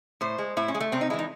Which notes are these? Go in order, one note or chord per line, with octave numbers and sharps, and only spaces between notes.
A2 C5
G#3
A2 E4
C#4
G#3
A3
C3 C4
D#4
E3 G#3 E4
D#4